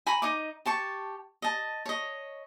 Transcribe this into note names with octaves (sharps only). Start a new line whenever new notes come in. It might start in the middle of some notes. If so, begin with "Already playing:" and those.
G#5 A#5 B5 C#6
D#4 D#5 D6
G4 A5 C#6
D#5 A5
C#5 D#5